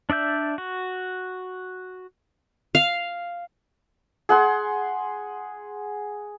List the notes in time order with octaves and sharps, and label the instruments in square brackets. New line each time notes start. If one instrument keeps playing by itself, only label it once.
[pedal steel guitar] D4 D5 E5 G6
F#4
[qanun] F5
[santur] G#4 F#5 C6